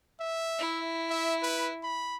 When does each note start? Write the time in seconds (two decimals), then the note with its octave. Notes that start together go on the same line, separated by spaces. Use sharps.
0.21 E5
0.58 E4
1.10 E5
1.43 B4
1.83 B5